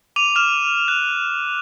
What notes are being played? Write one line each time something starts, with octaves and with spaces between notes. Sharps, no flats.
D6 D#7 F7
D6 F6 E7
F#6